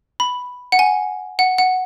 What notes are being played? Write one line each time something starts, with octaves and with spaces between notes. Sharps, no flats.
B5
F#5
G#5
F#5
F#5